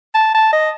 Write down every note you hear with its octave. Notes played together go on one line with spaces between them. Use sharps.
A5
A5
D#5